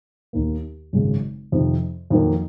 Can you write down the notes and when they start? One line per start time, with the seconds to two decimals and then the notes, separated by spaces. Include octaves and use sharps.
0.33 D#2 D#3 A#3
0.93 G#1 F#2 C#3 G#3
1.52 F2 C3 D#3
2.10 F2 D#3 F#3 A#3